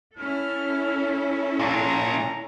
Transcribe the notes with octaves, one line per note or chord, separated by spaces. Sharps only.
C#4 E4 A4 F6
A#2 D4 A#5